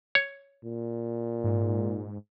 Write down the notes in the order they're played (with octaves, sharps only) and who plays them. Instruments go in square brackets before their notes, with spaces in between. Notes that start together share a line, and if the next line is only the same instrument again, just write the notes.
[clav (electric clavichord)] C#5
[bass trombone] A#2
[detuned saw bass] G#2